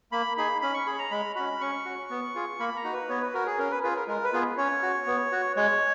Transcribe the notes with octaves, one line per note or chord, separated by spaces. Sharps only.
A#3 B5
D#4 G#4 B5
C#4 B5
C#6
G#4 B5
A#5
G#3 B5
C#4 F#4 B5
C#4 C#6
F#4
B3
F4 G#4
A#3 B5
A#5
D#4 F#4
B4
B3 C#5
B4
F#4 A#4
G#4
C#4 A#4
B4
F4 G#4 B4
A#4
G#3 A#4
B4
B3 F4 G#4
C#4 C#5
F#4
B3
F#4
G#3 C#5